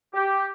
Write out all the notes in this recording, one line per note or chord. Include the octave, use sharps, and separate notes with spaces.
G4